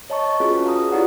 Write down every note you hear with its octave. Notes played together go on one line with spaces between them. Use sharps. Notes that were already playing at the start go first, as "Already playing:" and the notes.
C#5 D#5 A5 A#5 C#6
C#4 F4 F#4 G#4 B4 C#5
F5 A#5 D#6
E4 F4 G4 B4 D5 F#5